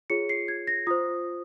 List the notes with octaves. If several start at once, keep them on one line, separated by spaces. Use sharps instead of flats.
F4 G#4 C#5 C#7
C7
G#6
A#6
F4 C5 D#6